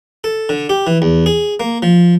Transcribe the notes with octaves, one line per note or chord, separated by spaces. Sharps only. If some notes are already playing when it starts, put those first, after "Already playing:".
A4
D3
G4
E3
E2
G#4
A#3
F3